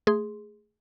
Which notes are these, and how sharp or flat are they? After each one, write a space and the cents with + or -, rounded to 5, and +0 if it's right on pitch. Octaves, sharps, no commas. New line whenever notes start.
A3 +0 G#4 +0 C6 +0